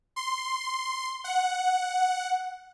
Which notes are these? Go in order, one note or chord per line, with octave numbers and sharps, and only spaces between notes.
C6
F#5